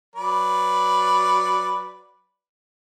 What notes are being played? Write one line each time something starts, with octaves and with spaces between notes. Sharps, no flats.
F#3 B4 D5